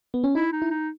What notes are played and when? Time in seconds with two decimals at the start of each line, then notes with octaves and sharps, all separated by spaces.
0.14 B3
0.24 C#4
0.35 D#4 E4
0.52 D#4
0.62 E4
0.71 D#4